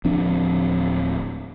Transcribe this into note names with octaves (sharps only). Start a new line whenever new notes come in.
D1 F3 C4 D4